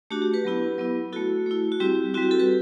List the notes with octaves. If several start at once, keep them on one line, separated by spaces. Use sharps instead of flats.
A3 D4 F#4 G4
G4
G4 B4
F#3 B3 E4
F#3 B3 E4
A3 E4 F#4 A4
A3 E4
F#4
G3 C4 E4 G4
G3 C4 E4 F#4
G4
F#4 A4
G4 B4